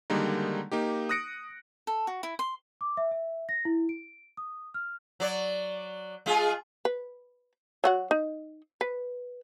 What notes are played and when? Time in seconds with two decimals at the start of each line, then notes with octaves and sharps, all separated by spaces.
0.10 D3 D#3 G3 G#3 A#3 D#4
0.72 A#3 D#4 G4
1.09 D#6 F#6 A#6 C#7 D7
1.87 A4
2.07 F#4
2.23 E4
2.39 C6
2.81 D6
2.97 E5
3.11 E5
3.49 A#6
3.65 E4
3.89 D7
4.37 D#6
4.74 F6
5.20 F#3 D5
6.26 G#3 F4 G#4
6.85 B4
7.84 F#3 F#4 F#5
8.11 D#4
8.81 B4